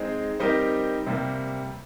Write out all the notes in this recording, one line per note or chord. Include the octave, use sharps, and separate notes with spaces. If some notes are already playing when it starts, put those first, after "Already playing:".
Already playing: G#3 C4 D#4 G#4
G3 C4 D#4 G4 A#4
C3 G3 A#3